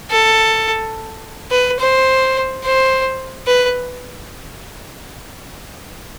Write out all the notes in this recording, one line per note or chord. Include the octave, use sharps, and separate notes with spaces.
A4
B4
C5
C5
B4